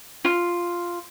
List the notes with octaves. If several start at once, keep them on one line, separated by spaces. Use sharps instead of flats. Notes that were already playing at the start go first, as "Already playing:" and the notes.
F4